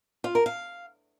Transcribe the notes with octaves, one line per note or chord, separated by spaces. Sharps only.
F4
A#4
F5